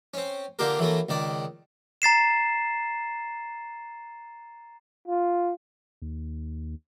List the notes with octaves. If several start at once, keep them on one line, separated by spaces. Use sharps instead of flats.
C4 C#4
D3 A#3 F4 G4 A#4
E3 F#3 A3 A#3
C#2 D#3 D5
A#5 A6 C7 E7
F4
D#2